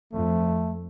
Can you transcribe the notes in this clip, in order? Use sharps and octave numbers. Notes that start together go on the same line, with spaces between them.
F2 A3